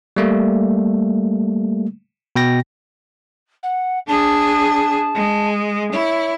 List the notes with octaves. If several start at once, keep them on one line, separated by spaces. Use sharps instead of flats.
G3 A3 A#3
B2 G5 A#6
F#5
D4 G#4 A5
G#3
E4 C#5